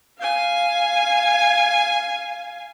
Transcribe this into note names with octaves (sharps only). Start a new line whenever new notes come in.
F5 G#5